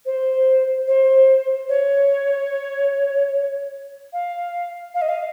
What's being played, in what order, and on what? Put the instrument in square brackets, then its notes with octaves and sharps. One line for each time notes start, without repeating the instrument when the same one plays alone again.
[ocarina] C5
C5
C#5
F5
F5
D#5
F5